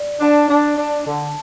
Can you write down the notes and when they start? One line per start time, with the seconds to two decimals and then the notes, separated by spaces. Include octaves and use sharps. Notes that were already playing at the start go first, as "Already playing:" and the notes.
Already playing: D5
0.20 D4
0.49 D4
0.77 D4
1.06 D3 A5